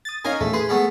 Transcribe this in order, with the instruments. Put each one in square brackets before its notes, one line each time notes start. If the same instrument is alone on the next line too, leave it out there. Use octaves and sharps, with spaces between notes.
[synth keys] D#6 A6
[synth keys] C#4 D#4 G#5 [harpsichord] A#4 F5
[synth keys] E2 A#2 [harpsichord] A3
[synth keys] G#4 [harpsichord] B4 C6
[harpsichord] A3 B3 C#4